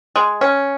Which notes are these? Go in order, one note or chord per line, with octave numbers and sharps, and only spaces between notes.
G#3
C#4